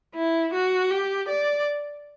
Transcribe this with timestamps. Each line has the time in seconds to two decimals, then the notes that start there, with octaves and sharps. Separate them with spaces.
0.14 E4
0.53 F#4
0.90 G4
1.29 D5